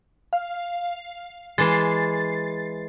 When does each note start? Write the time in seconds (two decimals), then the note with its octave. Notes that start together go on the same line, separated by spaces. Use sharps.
0.33 F5
1.58 E3 G#3 A6 C7